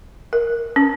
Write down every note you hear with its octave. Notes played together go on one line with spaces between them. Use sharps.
A#4
C#4